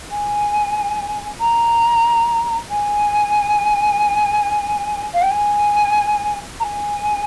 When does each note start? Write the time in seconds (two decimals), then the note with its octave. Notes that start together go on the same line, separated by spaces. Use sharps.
0.10 G#5
1.40 A#5
2.70 G#5
5.13 F5
5.21 G5
5.30 G#5
6.59 A#5
6.63 G#5